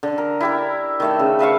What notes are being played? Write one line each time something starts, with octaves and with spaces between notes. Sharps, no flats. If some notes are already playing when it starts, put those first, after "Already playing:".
D3
A#4
E4 G4 A#4
D#3 A3 E5
C#3
B4 E5 F5 C#6